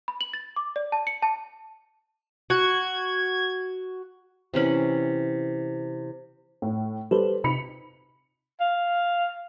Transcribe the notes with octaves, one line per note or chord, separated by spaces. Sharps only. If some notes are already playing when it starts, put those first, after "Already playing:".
B5
F#7
A6
D6
D5
A5
C#7
A5
F#4 G#6
C3 E3 C#4 B5
A2
G3 A4 B4 C5
C3 B5 C#7 F7
F5